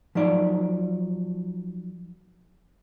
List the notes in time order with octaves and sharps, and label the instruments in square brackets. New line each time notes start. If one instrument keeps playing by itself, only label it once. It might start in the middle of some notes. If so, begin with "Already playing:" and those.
[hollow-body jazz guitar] F3 F#3 D#4 D5